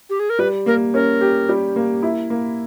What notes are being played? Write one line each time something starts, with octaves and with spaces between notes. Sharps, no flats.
G4
G#4
A#4
G3 B4
A#3 A#4
C#4 A#4
G4
G3
A#3
E4
A#3